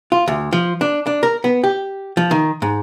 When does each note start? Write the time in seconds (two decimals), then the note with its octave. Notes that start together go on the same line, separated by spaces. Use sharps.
0.12 F4
0.28 D2
0.53 F3
0.81 D4
1.07 D4
1.23 A#4
1.44 B3
1.64 G4
2.17 F3
2.31 D#3
2.62 G#2